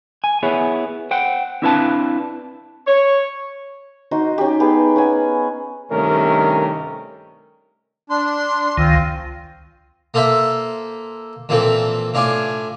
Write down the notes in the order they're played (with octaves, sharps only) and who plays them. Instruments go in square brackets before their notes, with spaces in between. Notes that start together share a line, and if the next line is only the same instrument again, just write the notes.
[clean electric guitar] G#5
B3 E4 G#4 C#5
C5 F#5 G5
C4 D4 E4 B4 F5 A5
[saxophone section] C#5
[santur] D#4 F#4 C5
C#4 G4
B3 G4 G#4
C#4 F#5 G#5
[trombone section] G2 C3 D#3 A3 C#4 A#4
[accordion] D4 [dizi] C6
[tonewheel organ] C#2 D#3 [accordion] C4 F4
[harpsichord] A#3 F4 A4 C5 E5
A#2 E3 F3 C4 A4
A2 D4 F4 G#5 D6